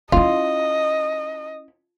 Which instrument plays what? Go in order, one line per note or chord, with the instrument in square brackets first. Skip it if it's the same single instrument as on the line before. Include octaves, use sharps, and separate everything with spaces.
[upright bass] C#4 E4 [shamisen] F4 [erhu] D#5